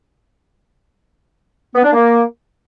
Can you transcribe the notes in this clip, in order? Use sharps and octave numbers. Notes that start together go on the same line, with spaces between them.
B3
D4
A#3